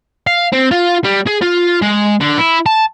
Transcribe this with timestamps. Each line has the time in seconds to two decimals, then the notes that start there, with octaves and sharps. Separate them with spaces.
0.27 F5
0.53 C4
0.71 F4
1.04 G3
1.27 G#4
1.42 F4
1.82 G#3
2.20 D3
2.38 E4
2.66 A5